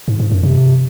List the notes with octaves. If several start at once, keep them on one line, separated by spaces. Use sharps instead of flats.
G#2
G#2
F#2
C3